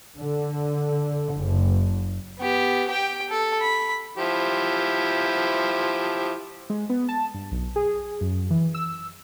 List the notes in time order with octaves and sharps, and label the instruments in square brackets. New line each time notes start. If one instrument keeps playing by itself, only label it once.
[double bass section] D3
F#1
[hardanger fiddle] B3 G4
G4 G5
A4
B5
[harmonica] F3 E4 G4
[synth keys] G#3
B3
A5
G2
B1
G#4
F#2
E3
E6